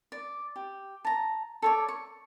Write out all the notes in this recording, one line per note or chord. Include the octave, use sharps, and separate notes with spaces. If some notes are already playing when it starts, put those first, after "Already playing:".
D5
G4
A5 A#5
A4 C#5 D5
C#6